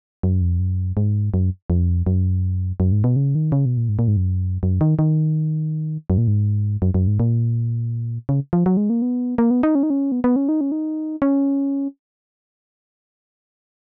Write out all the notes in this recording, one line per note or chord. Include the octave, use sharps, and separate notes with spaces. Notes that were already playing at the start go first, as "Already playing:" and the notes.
F#2
F2
F#2
G#2
F#2
F2
F#2
F#2
G#2
B2
C#3
D#3
C#3
B2
A#2
G#2
A#2
G#2
F#2
F#2
D#3
D#3
F#2
A#2
G#2
F#2
F#2
G#2
A#2
C#3
F3
F#3
G#3
A#3
B3
A#3
B3
D#4
C#4
D#4
C#4
B3
B3
C#4
D#4
C#4
D#4
C#4